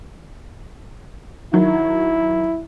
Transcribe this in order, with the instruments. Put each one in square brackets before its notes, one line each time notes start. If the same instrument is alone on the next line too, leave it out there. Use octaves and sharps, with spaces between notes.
[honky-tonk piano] D#3 F#3 [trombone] E4